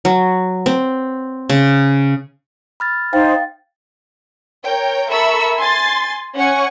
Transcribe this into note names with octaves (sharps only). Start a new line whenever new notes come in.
F#3
C4
C#3
B5 F6 A6
D#4 C5 F5 G5 A6
A#4 C#5 G5
A4 A#4 E5 B5 C#6 E6
G#5 C6 A6
C#4 C#5 F#5 G#5 C#6